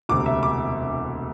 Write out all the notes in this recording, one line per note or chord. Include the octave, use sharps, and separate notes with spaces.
E1 D2 C3 D6
E5
D6